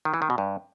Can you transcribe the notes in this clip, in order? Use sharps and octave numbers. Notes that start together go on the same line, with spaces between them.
D#3
E3
D#3
B2
G2